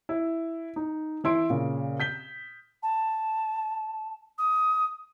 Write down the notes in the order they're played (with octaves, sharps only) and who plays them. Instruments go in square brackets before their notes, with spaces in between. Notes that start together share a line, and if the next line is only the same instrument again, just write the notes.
[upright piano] E4
D#4
E3 E4 C6 D7
A#2 C#3
G6 B6 G7
[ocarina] A5
D#6